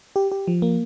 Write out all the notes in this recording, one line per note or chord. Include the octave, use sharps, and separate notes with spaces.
G4
G4
F3
A#3